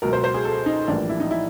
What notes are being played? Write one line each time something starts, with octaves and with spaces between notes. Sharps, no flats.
C#2 B2 F#3 A#4
C5
C5
G#4
A4
D#4
A#1 A2 E3 G3 A#3 D4
E4
D#4
E4